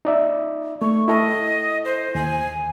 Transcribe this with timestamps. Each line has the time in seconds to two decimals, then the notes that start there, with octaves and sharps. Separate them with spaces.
0.05 D#4 D5 E5
0.82 A3 C#6
1.08 E4 A4 D#5
1.85 C5
2.15 D#2 G#5